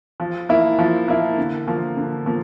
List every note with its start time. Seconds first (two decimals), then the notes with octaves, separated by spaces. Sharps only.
0.20 F3
0.49 A#3 E4
0.79 F3
1.08 A#3 E4
1.38 D3
1.67 F3 A#3
1.97 D3
2.26 F3 A#3